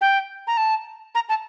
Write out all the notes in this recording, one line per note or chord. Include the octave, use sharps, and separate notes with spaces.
G5
A#5
A5
A#5
A5